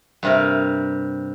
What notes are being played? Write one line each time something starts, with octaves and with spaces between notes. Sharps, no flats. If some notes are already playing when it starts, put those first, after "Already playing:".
G2 C3 A#4